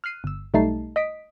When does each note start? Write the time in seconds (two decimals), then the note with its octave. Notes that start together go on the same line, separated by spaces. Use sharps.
0.04 F6 F#6 C7 D#7
0.24 G1 E6
0.54 B1 G3 A3 D#4 A5 C7
0.96 D#5 D#6 B6 D7